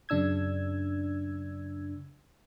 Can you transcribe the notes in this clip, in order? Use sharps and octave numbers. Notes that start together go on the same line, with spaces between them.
F#2 C#3 D4 E6 G#6